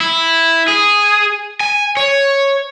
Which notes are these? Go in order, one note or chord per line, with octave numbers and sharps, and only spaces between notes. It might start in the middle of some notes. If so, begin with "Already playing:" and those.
E4
G#4
G#5
C#5